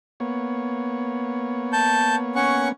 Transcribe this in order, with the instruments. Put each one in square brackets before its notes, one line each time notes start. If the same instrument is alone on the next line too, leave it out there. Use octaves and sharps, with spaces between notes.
[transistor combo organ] A#3 B3 C#5
[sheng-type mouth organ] A5 G6
C#4 F#5 C#6